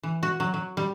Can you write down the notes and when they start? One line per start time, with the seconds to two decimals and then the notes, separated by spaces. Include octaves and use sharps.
0.03 E3
0.23 F#4
0.40 F#3
0.54 F#3
0.77 G3